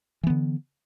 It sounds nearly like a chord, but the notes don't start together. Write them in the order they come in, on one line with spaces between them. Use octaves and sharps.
E3 B3 D3